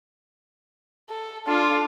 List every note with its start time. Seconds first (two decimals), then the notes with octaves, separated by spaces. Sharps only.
1.10 A4
1.47 D4 F4 A4